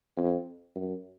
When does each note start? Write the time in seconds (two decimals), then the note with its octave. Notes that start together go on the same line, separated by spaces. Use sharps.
0.17 F2
0.76 F#2